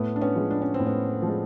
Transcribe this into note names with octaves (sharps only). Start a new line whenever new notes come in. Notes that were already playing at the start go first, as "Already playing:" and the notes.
Already playing: A2 A3 B3
D4
B3 C#4
F3 G#3
D4
C#4
C4
A2
B3 C#4
F3 G#3